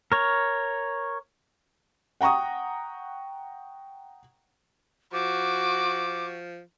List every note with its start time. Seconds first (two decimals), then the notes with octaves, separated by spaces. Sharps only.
0.12 A#4 C#5
2.21 F#5 G5 A#5 C#6 D#6
5.13 F3 F#4 D6